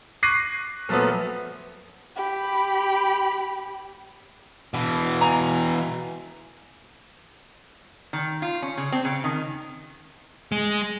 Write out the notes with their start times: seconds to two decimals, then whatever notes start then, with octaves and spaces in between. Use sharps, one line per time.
0.23 C#6 D6 F#6 A#6 C7 D#7
0.89 A#2 F3 F#3 A3 B3
2.16 G4 B5
4.74 B2 E3
5.21 G#5 A#5
8.13 D#3
8.42 F4
8.62 C#4
8.77 C#3
8.92 C4
9.05 C#3
9.24 D#3
10.52 G#3